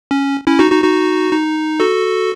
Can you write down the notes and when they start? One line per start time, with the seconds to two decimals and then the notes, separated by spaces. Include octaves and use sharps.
0.11 C#4
0.47 C#4 E4
0.59 D#4 F#4
0.71 D#4 F#4
0.84 D#4 F#4
1.32 D#4
1.80 F#4 A4